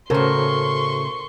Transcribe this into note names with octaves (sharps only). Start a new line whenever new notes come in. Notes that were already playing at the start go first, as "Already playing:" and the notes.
A2 C#3 F#4 A4 A#4 C5 C6 C#6